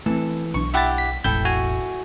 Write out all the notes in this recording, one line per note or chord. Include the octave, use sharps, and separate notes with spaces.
E3 A3 C4 A4
B1 D4 C#6
E4 G4 E5 F#5 A6
B6
E1 A1 E4 A4 G5 G6
F#4 G#5